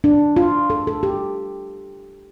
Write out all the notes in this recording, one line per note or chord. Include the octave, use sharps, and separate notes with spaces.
D4
F4
A4
A4
G4